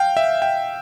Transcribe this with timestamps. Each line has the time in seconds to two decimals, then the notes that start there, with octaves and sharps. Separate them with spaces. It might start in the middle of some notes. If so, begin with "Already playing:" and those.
Already playing: F5 G5
0.17 E5
0.42 G5